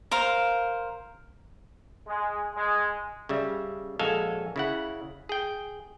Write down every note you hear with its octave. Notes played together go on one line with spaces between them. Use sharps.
A#4 C5 F5
G#3
G#3
C#3 G3 E5
A#1 G#3 F#4 A4 F5 G#5
C#3 E4 F#5
G#4 G5